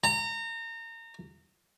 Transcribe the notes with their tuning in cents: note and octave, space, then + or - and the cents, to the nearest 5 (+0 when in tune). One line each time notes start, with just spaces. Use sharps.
A#5 -30